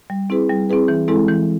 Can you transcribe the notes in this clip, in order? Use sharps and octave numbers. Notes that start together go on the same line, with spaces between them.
G3
C4 E4 G#4 B4
G3
C4 E4 G#4 B4
E3
G#3 C4 E4 A4
E3